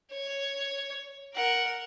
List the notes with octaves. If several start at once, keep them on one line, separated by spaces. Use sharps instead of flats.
C#5
A#4 F#5